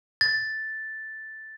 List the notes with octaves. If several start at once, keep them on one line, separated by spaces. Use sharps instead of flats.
A6